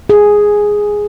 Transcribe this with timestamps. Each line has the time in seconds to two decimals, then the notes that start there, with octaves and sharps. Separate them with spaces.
0.09 G#4